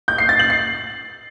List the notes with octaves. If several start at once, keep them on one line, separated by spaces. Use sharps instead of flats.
G6
C7
A6
F#7
C7